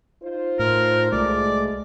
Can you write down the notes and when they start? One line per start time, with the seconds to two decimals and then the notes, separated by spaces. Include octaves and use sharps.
0.23 D#4 F4 C5
0.59 A2 A#4
1.12 C2 G#3 A3 D5